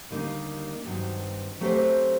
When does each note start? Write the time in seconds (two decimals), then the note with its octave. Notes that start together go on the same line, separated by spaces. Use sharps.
0.10 D#2 D3 G3 A#3 D#4
0.86 G2 D#3 F#3 C4
1.61 F#3 A3 C4 G4 C5